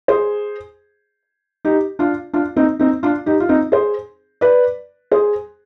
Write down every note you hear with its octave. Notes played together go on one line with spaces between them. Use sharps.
G#4 C5
D#4 G4
D4 F4
D4 F4
C4 D#4
C4 D#4
D4 F4
D#4 G4
F4
C4 D#4
G#4 C5
B4 D5
G#4 C5